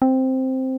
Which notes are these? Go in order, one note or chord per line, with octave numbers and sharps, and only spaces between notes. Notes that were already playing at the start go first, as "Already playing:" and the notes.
C4